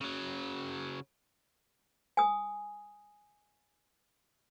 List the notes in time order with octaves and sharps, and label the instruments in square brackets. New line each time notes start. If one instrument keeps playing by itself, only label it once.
[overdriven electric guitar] C#3 F#3
[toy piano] G#5 D#6